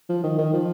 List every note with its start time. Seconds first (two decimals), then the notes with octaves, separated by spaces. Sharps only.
0.09 F3
0.24 D#3
0.39 D#3
0.53 F3